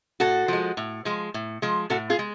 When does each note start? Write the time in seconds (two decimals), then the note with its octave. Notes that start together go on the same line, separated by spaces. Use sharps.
0.20 A2 F#4 A4
0.48 F3 G#3
0.77 A2
1.05 F3 G#3
1.34 A2
1.62 F3 G#3
1.90 A2 F#4 A4
2.10 F4 G#4
2.19 G#3